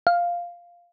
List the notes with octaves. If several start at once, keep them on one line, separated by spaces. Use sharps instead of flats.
F5